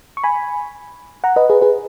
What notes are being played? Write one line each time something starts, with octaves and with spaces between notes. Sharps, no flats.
C#6
G#5 B5
F#5 A#5
B4 D#5
G#4 B4
G#4 B4